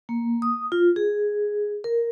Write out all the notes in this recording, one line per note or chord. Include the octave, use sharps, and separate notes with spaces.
A#3
D#6
F4
G#4
A#4